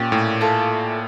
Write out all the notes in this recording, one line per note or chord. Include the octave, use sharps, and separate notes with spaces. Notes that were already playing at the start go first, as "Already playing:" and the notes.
Already playing: A#2 C#4 G4 C#5 G5
A2
F4 A4 E5